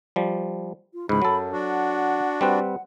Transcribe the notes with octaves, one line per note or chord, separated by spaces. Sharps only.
F3 G3
F4
C#2 G#2 E3 B5
F#2 F#3 A4
D4 F#4 F#5
G3 C4 B4